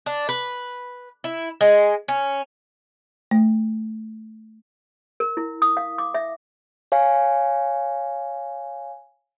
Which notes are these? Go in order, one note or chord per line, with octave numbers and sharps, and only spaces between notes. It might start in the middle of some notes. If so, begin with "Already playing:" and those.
D4
B4
E4
G#3
C#4
A3
A#4
E4
D#6
F5
D6
E5
C#5 F5 G#5